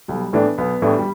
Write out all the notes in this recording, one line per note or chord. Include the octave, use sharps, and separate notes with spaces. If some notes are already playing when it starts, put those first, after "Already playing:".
B1 G3
A2 E3 A3 B3 D4
B1 B3
A2 E3 G3 A3 D4
G3